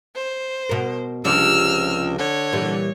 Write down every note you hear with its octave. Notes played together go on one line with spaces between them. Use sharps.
C5
B2 A#4
C#2 C3 F3 D4 E6 F6
D3 C#5
A#2 E3 G3